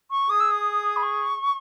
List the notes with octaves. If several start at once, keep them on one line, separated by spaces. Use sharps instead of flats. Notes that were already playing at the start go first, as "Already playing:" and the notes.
C#6
G#4 D#6
E6
D#6
B5
C#6